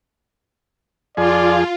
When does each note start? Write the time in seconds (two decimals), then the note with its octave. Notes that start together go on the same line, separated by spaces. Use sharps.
1.17 F2 F4 G#4 D5